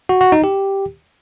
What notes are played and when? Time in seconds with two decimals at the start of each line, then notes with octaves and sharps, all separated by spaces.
0.09 F#4
0.21 F#4
0.32 D#4
0.44 G4